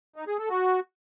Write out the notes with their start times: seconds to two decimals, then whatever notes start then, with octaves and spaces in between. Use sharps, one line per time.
0.16 D#4
0.27 G#4
0.38 A4
0.50 F#4